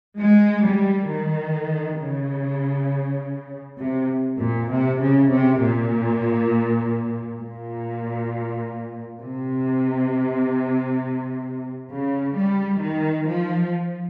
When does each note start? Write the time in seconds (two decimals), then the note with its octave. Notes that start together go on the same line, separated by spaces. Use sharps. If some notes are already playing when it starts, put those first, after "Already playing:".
0.19 G#3
0.63 G3
1.08 D#3
1.99 C#3
3.79 C3
4.40 A#2
4.70 C3
4.99 C#3
5.30 C3
5.60 A#2
7.40 A#2
9.21 C3
11.91 C#3
12.36 G3
12.81 D#3
13.27 F3